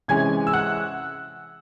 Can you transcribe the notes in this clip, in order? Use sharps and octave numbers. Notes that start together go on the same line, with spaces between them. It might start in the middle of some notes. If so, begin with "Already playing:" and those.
C3 E3 G#3 C#4 G#5 G#6
E6
F#5 F#6